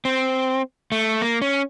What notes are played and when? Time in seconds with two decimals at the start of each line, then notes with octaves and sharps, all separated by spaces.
0.05 C4
0.92 A3
1.22 A#3
1.42 C#4